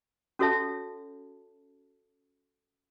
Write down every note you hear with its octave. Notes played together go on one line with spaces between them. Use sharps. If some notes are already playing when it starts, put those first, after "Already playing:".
C#4 F#4 A4 C#5 E5 A5